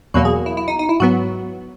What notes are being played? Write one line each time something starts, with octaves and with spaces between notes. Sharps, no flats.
E2 B2 F#3 A#3 F#4
G#4
E4
E4
D#4
D#4
E4
G#2 F#3 B3 F#4